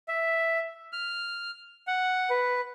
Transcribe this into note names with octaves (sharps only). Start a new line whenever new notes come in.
E5
F6
F#5
B4